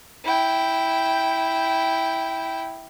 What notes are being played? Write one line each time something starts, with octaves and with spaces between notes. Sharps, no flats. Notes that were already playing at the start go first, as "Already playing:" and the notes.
E4 G5